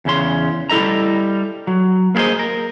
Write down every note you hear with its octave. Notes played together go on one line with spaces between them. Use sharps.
E2 C#3 C#4 C6
G3 E4 A4 D#5 A#5
F#3
A#3 B3 G#4 C5 D#5
A#4